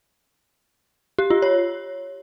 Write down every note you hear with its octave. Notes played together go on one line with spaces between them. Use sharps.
G4
F4
C#5